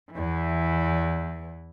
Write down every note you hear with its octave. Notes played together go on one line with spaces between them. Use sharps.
E2 E3